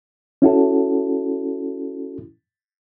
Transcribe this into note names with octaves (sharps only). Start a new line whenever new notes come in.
C#4 E4 F#4 A4